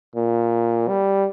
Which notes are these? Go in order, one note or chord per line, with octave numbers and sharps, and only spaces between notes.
A#2
G3